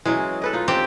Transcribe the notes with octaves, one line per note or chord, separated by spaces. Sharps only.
E3 F#3 G#3 C#4
A4 B4 D#5
D#4 F4
C4 G4